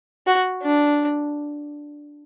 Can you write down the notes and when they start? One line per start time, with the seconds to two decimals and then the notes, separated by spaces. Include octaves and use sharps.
0.27 F#4
0.63 D4